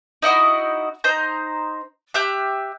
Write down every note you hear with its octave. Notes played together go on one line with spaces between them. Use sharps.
D#4 E4 F#4 D#5
D#4 C5 A#5 G6
G4 E5 F#6